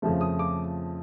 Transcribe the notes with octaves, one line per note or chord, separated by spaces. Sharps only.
F2 C#3 F3 A3
D#6
D6